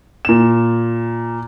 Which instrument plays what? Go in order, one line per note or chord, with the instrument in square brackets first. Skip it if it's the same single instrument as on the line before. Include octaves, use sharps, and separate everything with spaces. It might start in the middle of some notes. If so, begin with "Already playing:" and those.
[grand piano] A#2 E7